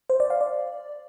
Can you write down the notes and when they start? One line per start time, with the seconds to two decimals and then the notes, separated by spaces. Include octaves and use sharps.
0.10 C5
0.20 D5
0.30 F5
0.41 D5